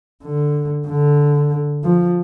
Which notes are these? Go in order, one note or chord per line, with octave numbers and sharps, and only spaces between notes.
D3
D3
F3